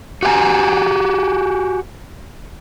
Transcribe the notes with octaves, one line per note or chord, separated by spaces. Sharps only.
F#4 G4 F5 G#5 A#5